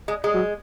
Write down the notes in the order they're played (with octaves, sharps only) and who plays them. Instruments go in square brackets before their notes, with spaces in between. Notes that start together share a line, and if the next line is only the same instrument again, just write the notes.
[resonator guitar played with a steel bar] G#3
G#3
[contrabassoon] F#3